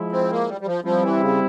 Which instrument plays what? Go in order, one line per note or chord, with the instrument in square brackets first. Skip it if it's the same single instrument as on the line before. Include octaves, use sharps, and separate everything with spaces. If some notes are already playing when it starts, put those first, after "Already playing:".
Already playing: [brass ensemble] F3 G#3 E4
[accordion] C4
A#3
G3
G3
F3
[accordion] F3 [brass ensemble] G3 C4 E4
[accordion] E3
C#3